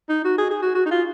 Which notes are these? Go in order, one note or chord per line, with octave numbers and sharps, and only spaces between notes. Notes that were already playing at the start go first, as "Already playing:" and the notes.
D#4
F#4
G#4
G#4
F#4
F#4
D#4
F4